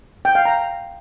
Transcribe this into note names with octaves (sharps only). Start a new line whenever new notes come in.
G5
F5
A#5